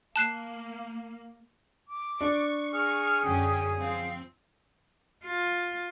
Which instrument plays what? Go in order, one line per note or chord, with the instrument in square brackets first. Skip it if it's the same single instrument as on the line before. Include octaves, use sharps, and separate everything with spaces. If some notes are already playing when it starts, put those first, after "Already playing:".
[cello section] A#3 [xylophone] A5 F#6 C7
[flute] D6
[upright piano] D4 [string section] C#6
[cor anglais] G#4 [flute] F6
[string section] F#2 D3 C#4 [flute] G5
[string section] F3 C4 [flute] F5
[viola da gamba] F4